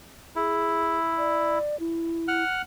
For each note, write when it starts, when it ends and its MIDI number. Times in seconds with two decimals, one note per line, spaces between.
0.36 1.59 64
0.36 0.99 68
1.18 1.78 74
1.80 2.43 64
2.28 2.62 78
2.28 2.62 89
2.28 2.62 90